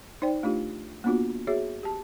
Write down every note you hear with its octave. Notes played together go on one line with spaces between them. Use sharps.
D#4 C5 D5 G5
A3 D4 F4 G4
A#3 B3 D4 F4 F#4
F#4 G#4 C#5 E5
G4 A5